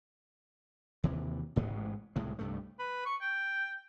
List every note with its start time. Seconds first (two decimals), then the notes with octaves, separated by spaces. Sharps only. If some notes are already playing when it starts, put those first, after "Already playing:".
1.04 D#2 C3 E3
1.56 A1 G#2 B2 G#3
2.16 C2 A2 G#3
2.39 C2 G2 A3
2.79 B4
3.06 C#6
3.21 G5